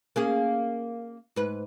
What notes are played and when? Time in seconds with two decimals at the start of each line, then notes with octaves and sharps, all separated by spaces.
0.16 A#3 C#4 G#4
1.36 G#2 B4